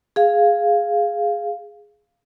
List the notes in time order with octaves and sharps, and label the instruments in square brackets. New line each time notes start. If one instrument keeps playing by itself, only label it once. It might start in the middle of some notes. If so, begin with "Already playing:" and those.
[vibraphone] G#4 F5